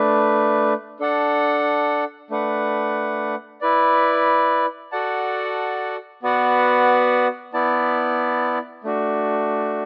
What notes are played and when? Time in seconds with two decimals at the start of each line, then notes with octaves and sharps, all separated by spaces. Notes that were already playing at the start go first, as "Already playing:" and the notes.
Already playing: A3 D4 B4
1.00 D4 A4 F#5 A5
2.30 A3 D4 B4 F#5
3.61 E4 B4 D5
4.92 F#4 A4 D5 F#5 A5
6.23 B3 F#4 B4 D5 F#5
7.54 B3 E4 D5 A5
8.84 A3 D4 F#4